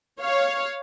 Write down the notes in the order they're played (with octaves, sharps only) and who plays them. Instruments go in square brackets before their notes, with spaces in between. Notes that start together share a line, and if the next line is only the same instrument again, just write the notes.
[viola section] C#5 F5